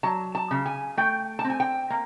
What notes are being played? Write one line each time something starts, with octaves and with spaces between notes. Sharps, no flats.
F#3 A5
A5
C#3
G#5
A3 G5
A5
C4
G#5
G5
A#3